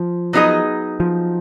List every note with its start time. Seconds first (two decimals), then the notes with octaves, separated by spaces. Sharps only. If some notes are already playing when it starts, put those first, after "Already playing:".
Already playing: F3
0.33 F#3 B3 D#4 G#4 D#5
1.00 F3